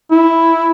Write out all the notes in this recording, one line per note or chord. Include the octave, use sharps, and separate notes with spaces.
E4